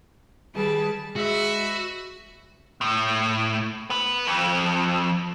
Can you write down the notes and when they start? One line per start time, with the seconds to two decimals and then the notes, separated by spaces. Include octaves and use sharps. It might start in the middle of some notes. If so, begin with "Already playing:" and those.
0.55 D#3 G3 G#4 B4 A5
1.16 G#3 F#4 B4 E5
2.81 A2
3.90 B3 B4
4.27 F2